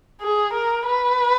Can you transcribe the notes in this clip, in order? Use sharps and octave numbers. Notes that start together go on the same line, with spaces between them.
G#4
A#4
B4